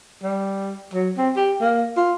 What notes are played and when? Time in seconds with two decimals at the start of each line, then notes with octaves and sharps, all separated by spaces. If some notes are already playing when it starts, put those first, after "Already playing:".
0.23 G3
0.94 F#3
1.17 C4
1.36 G4
1.61 A#3
1.97 F4